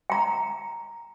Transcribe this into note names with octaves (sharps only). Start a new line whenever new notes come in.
G5 A#5